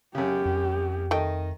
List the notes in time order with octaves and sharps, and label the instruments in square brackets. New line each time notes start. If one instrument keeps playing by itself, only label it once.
[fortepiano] F#2 C#3 [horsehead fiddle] G4
[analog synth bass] F2
[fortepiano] D#3 D#5 [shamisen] A3 G5